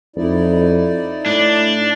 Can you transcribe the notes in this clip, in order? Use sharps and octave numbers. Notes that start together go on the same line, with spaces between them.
F2 D#4 E4 D5
A2 D4